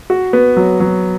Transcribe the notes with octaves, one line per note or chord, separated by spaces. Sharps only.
F#4
B3
F#3
F#3